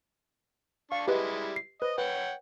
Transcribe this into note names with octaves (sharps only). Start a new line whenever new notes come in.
D4 F5 C#6
G3 G#3 E4 G4 B4 D#5
C7
B4 C5 D#5
B4 C#5 F#5 G5